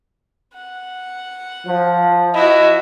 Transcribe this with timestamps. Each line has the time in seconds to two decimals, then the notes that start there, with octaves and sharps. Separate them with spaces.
0.53 F#5
1.67 F3
2.34 E4 F#4 D#5